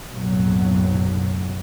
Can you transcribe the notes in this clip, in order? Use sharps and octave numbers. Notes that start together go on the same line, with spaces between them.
F#1 B1 A2 F#3